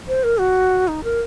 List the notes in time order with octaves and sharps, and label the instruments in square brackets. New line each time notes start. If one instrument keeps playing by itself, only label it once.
[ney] C5
A#4
F#4
D#4
A#4